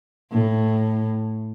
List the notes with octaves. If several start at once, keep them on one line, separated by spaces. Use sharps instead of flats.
A2